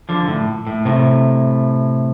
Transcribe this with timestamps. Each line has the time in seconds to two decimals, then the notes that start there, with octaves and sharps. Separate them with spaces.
0.09 D3 F3
0.28 A2
0.67 A2
0.85 A2 C3